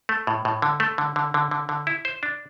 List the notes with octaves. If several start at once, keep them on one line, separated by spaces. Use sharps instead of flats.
A3
A2
A2
D3
A3
D3
D3
D3
D3
D3
E4
C5
D4